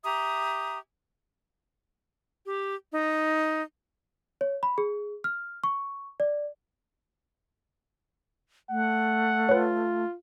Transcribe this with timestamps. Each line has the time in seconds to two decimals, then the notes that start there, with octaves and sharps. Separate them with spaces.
0.04 G4 E5 A#5 D#6
2.46 G4
2.92 D#4
4.41 C#5
4.63 B5
4.78 G#4
5.24 F6
5.64 C#6
6.20 D5
8.70 A3 F#5
9.49 F4 B4 C#5